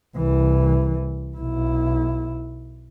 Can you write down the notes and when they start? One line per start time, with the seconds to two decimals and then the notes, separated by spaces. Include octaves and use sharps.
0.16 C2 E3
1.37 B1 E4